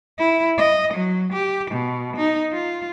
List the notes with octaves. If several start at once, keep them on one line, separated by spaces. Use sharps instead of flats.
E4
D#5
F#3
G4
B2
D#4
F4